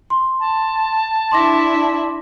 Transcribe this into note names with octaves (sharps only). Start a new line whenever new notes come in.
C6
A5
D4 E4 C6 D6 A#6